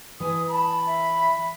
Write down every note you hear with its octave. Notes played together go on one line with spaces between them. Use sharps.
E3 G#5 D#6
A5 B5
E5